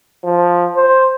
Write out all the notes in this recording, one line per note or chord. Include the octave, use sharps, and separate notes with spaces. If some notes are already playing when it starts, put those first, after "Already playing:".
F3
C5